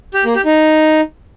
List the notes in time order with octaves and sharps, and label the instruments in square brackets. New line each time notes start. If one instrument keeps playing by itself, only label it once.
[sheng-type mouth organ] G4
A#3
G4
D#4